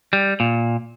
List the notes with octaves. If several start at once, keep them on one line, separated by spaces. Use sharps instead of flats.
G3
A#2